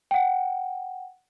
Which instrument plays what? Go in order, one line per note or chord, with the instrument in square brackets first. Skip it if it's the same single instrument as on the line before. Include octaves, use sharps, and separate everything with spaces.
[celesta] F#5 G5